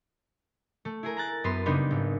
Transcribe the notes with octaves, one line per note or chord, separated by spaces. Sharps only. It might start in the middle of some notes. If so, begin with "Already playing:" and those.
A3
E4 G#4 A#4
A#5 F#6 A6
F#2 B3 B4 C6
C#3 G3 A#3 B3 D4 D#4
G#1